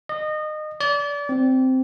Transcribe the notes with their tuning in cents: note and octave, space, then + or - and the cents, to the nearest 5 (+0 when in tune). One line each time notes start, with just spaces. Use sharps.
D#5 -25
D5 -30
C4 -10